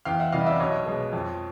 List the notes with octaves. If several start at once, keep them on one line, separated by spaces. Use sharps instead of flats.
E2 F5 G5
E5 F#5
C3 E3 G3 D#5 F5
D5 E5
B1 C#5 D#5
B2 G#3
F2